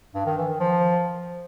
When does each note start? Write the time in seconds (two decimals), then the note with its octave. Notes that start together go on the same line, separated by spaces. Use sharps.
0.15 G2
0.26 D#3
0.37 E3
0.49 D#3
0.60 F3